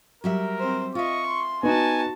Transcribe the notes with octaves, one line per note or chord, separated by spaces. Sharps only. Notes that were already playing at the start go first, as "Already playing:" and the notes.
F#3 G3 A#4 E5
C4 C5
F4 D#5 E5 C#6
C6
B3 D#4 F#4 G#5 A5